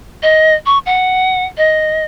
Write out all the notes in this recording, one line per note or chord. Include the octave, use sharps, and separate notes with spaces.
D#5
C#6
F#5
D#5